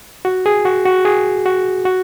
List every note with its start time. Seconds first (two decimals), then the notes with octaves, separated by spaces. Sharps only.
0.25 F#4
0.46 G#4
0.65 F#4
0.86 F#4
1.05 G#4
1.46 F#4
1.85 F#4